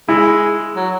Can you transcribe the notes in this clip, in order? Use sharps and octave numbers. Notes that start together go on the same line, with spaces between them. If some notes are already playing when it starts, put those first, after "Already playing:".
G#3 E4
F#3